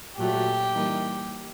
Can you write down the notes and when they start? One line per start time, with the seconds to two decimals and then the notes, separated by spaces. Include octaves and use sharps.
0.17 A#2 F#3 A3 G4
0.73 E3 G3 A#3 D#4